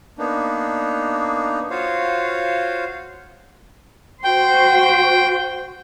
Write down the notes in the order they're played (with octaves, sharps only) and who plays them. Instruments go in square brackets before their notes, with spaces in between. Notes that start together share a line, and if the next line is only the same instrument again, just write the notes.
[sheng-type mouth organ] A#3 B3 D4 D#4
F4 F#4 C5 C#5 F5
[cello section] F#4 C5 [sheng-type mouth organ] G5